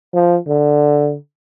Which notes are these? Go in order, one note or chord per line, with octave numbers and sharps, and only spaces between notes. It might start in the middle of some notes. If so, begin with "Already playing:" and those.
F3
D3